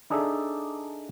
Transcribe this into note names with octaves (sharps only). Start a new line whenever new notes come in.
D4 D#4 G#4 A4 D5 E5